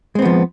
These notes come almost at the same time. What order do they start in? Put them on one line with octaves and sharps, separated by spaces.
G#3 C4 B3 F3